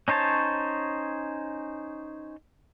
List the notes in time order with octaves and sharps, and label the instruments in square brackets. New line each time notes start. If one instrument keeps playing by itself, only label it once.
[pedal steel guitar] C#4 D#4 C5 C#5 A5